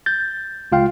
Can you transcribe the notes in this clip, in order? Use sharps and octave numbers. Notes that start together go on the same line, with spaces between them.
G6 A6
C#2 F4 F5 G5